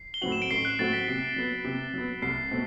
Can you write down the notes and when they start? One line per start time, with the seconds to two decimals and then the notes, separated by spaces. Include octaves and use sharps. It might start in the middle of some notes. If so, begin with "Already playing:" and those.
Already playing: C7
0.14 G7
0.22 A2 F#3 C4 F#4 F#7
0.32 E7
0.42 D7
0.50 A1 C7
0.65 F#6
0.79 A2 F#3 C4 F#4 A6
0.93 B6
1.08 C3 D7
1.36 F#3 B3
1.65 C3
1.94 F#3 B3
2.22 C2 C7
2.51 B2 A3 C4